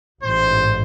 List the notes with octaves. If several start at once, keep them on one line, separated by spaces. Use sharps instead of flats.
A1 G#2 C5